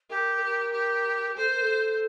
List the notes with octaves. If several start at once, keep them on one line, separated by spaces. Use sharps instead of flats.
G4 A#4
A#4
G4
A4 C5
A#4
A4